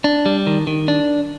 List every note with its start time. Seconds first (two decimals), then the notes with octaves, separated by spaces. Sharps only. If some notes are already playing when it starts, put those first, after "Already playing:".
0.04 D4
0.26 G3
0.47 D#3
0.67 D#3
0.88 D4